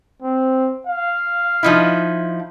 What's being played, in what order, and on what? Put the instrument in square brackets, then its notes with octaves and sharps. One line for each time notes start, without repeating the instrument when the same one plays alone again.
[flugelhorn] C4
F5
[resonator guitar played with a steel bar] F3 D#4 E4